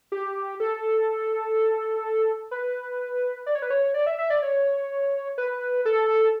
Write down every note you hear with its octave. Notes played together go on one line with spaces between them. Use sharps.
G4
A4
B4
D5
C#5
B4
C#5
D5
E5
E5
D5
C#5
B4
A4